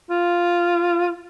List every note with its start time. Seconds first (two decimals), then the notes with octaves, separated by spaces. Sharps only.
0.10 F4